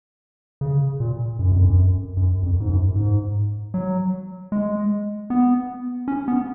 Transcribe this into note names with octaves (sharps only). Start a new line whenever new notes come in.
C#3
A#2
F#2
F2
F#2
F#2
F2
G#2
F#2
G#2
F#3
G#3
B3
C#4
B3